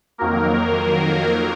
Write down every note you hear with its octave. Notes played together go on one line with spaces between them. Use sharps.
F2 D#3 F#3 A#3 A#4